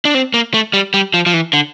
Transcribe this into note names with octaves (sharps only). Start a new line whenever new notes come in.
D4
C4
A#3
A3
G3
G3
F3
F3
E3
D3